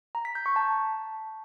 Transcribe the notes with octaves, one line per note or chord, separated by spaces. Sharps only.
A#5
B6
G6
C#6
A5